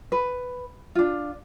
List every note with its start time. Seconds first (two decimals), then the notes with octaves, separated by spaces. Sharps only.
0.12 B4
0.95 D4 F4